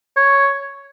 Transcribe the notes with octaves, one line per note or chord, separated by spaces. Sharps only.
C#5